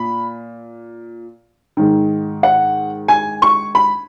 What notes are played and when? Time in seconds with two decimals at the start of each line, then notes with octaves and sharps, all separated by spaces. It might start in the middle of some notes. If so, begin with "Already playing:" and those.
Already playing: A#2 B5
1.77 G#2 D#3
2.43 F#5
3.08 G#5
3.42 C#6
3.75 B5